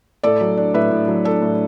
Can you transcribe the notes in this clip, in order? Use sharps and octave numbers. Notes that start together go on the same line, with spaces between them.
A2 A4 D5
F#3
D4
A2 B4 E5
A2
F#3
D4 A4
A2